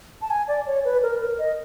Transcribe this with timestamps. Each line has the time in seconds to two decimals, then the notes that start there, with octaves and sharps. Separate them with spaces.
0.22 A5
0.30 G#5
0.48 D5
0.67 C#5
0.85 B4
1.03 A#4
1.21 A#4
1.39 D#5